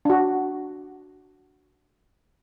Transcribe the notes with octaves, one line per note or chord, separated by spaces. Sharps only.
D4 F#4